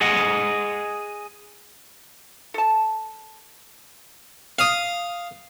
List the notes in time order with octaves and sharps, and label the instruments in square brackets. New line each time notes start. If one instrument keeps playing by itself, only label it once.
[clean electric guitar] G#4 D#5 F#5
[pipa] A4 A5
[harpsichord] F5 D#6